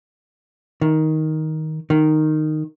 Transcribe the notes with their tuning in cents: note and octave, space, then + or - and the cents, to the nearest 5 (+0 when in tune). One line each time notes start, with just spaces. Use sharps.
D#3 +10
D#3 -10